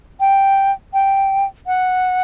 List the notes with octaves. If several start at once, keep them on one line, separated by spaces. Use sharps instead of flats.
G5
G5
F#5